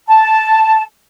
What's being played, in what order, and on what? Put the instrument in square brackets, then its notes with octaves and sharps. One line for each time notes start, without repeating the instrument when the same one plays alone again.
[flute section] A5